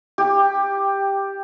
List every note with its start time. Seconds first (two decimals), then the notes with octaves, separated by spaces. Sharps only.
0.18 G4